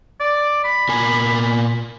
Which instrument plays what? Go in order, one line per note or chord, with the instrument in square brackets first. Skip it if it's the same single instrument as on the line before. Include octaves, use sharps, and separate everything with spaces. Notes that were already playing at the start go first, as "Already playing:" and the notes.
[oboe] D5
B5
[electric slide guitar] A#2 A#4 G#5